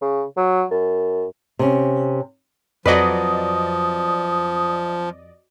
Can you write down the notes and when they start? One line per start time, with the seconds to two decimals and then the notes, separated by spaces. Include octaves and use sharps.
0.02 C#3
0.37 F#3
0.71 F#2
1.59 C3 C#4
2.86 F2 F3 F#3 B4 D5 D#5 D#6